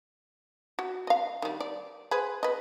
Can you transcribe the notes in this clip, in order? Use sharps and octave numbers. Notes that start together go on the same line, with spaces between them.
F#4
D#5 F5
D#3 G3
D5
G#4 B4 C5
B4 D#5